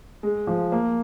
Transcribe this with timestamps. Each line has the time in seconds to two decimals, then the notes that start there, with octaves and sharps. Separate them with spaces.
0.23 G#3
0.47 F3
0.72 A#3